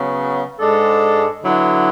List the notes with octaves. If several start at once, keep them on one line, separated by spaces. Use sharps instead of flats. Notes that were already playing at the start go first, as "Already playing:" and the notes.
Already playing: C#3 F#3 B3
G#2 G#3 D4 A4
D3 F#3 B3 E4